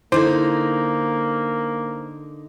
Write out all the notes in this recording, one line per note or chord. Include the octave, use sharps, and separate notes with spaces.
D3 A#3 D#4 E4 A4 C5